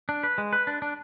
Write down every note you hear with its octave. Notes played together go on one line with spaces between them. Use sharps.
D4
B4
G#3
B4
D4
D4